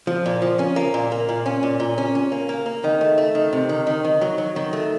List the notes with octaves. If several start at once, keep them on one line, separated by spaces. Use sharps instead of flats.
F3
A#2
F3
C#4
A#3
A#2
A#3
A#2
C#4
A#2
A#2
C#4
C#4
A#3
A#3
A#3
D#3
A3
A3
D#3
C3
D#3
D#3
D#3
F#3
F#3
D#3
A3